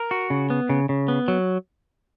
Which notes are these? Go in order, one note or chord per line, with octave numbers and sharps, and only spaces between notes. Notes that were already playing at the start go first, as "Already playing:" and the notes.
Already playing: A#4
F#4
C#3
B3
C#3
C#3
B3
F#3